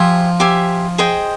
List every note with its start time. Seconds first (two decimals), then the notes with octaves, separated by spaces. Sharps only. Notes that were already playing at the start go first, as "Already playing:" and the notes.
Already playing: F3 G4 C5 E5 G#5
0.40 G4 C5 E5 G#5
0.98 G#4 C5 D#5 G5